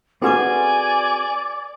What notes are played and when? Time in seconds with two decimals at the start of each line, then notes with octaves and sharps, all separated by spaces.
0.22 C4 F#4 G#4 A4 B4 D5 G#5 D6